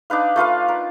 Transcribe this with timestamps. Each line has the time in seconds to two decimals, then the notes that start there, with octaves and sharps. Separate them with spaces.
0.10 D4 D#4 B4 F5
0.36 A3 F4 B4 F5
0.68 A#4